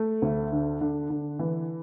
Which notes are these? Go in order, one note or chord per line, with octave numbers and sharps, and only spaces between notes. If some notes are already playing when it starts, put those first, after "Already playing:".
Already playing: A3
D2
D3
D3
D3
E3